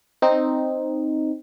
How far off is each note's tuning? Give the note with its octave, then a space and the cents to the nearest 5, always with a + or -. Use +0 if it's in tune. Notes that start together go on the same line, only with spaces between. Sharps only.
C4 +0 D#4 -5